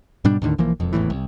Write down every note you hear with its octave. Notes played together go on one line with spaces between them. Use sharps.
G#2 B2 G3 D4
D#2 A2 D3 D#3
B1 E3 F3 A#3
E1 F2
G#1 E2 A2 E3
C2